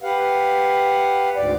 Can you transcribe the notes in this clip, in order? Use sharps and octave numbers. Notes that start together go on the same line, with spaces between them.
G4 B4 F5 F#5
D2 G#2 D5